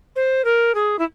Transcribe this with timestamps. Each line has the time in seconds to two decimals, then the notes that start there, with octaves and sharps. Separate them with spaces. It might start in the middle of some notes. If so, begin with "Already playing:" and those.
0.16 C5
0.44 A#4
0.75 G#4
0.99 E4